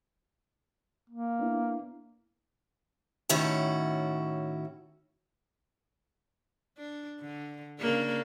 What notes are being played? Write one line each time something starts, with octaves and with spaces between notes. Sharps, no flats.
A#3
B3 D4 E4
A2 D#3 C#4 E4 F#4
D4
D3
C#3 A#3 D4